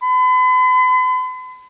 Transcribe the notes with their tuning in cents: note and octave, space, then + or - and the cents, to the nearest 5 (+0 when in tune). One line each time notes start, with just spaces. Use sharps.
B5 +45